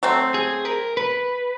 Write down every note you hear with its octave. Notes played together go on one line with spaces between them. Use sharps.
F#3 A3 C4
G#4
A#4
B4